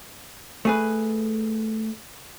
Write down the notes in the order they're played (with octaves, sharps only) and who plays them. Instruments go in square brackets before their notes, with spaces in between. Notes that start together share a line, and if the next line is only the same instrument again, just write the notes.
[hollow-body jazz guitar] A3 G#4 B4